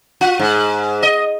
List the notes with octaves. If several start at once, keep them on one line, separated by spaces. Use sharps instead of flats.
F4
G#2
D#5